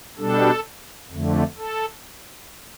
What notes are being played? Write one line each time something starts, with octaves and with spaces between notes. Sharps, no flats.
B2 G3 D4 A4
F2 D3 A3
A4